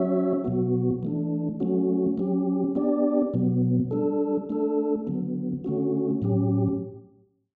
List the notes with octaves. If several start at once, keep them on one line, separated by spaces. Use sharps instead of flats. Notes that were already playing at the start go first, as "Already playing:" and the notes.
Already playing: F#3 C#4 F#4 C#5 E5
B2 F#3 B3 F#4
E3 A3 D4
F#3 A3 C#4 F#4
F#3 C#4 G4
B3 D4 G4 D5
B2 F#3 B3
G3 D4 A4
A3 D4 A4
D3 F#3 B3
D3 A3 C#4 F#4
A2 F#3 C#4 G4